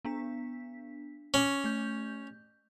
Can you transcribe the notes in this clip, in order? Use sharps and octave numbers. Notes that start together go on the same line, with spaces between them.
B3 D4 B6
C#4 C#6 D6
A3 G6